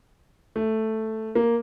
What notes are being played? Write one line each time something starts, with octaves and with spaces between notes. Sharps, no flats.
A3
A#3